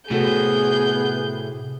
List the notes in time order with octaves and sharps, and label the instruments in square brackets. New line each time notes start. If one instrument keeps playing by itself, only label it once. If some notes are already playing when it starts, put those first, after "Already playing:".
[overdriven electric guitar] A2 [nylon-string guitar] C3 F#4 A4 [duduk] B3 [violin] G#4 G6